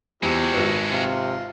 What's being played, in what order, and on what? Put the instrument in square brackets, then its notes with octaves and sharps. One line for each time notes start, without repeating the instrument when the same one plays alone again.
[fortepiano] E2 [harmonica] F3 C4 E4 [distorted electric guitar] G#3 F#4 [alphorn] G4
[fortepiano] G#1 B4
[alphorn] C3 [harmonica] F4